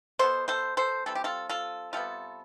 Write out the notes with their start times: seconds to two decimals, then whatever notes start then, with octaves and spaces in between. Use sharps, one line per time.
0.19 B2 B3 A4 C5
0.48 A4 C5
0.77 A4 C5
1.06 E3 G3 C4 A4
1.15 G4
1.24 F4 A4
1.49 F4 A4
1.93 C3 G3 B3 F4 A4